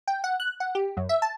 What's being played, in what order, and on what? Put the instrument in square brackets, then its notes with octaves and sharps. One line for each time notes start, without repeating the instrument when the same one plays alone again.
[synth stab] G5
F#5
F#6
F#5
G4
F#2
E5
A5